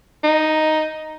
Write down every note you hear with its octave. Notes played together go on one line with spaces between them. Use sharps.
D#4